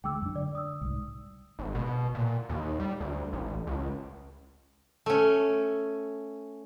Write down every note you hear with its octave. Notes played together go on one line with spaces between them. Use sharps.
D2 G#3 G5 D6 E6
F#2 D4
D3 D5
D#6 E6
C2 G#2
G#1
B2
A#2
D#2
G3
D2
A1
C#2
A3 C#4